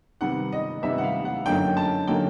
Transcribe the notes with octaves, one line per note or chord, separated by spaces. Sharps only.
C3 D#3 G3 B3 F#5
D#5
C3 D#3 G3 B3 E5
F#5
F5
F#5
F#2 D3 F#3 A#3 D#4 G5
A5
D3 F#3 A#3 D#4 G5